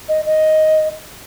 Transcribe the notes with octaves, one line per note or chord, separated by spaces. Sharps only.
D#5
D#5